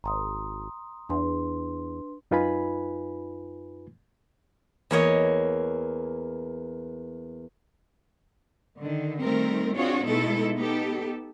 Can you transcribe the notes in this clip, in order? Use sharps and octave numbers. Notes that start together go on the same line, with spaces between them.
G#1 A#5 C6 D#6
E2 D4 B4 C6
F#2 D#4 F4 B4 G#5 B5
E2 A#3 C#5 D#5
D3 D#3
D#3 G3 A3 C4 A#4
C4 D4 F4 F#4 G#4 C#5
B2 G#3 A3 D#4 E4 A4
B3 D#4 G4 A4